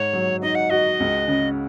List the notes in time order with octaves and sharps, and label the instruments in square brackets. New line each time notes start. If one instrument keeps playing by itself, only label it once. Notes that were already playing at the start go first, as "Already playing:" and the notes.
Already playing: [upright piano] G#2 [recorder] C#5
[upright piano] F#3
[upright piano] D#4 [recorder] D#5
[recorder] F#5
[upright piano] F#4 [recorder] D#5
[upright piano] C#2
C#3